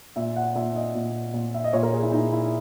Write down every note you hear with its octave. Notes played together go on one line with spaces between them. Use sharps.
A#2 E5
F#5
A#2 E5
D#5
A#2
A#2
E5
D#5
A#2 C#5
A#4
G#4
E4
A#2 D#4
E4